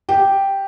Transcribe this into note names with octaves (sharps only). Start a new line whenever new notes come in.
G4